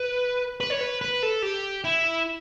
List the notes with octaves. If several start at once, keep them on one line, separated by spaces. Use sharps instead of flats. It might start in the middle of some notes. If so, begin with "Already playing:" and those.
Already playing: B4
B4
C#5
B4
B4
A4
G4
E4